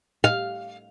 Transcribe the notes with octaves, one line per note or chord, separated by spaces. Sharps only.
F5